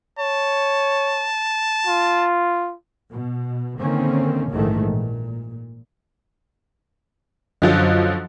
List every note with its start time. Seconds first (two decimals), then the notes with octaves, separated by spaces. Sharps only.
0.19 C#5 A5
1.87 F4
3.13 B2
3.80 D3 D#3 A#3 C4 C#4
4.51 A#1 G#2 D#3 E3 A3
4.91 A#2
7.62 F#2 D3 F3 F#3 D#5